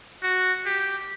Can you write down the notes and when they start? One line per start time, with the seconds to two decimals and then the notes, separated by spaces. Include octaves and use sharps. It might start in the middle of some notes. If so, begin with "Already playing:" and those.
0.23 F#4
0.66 G4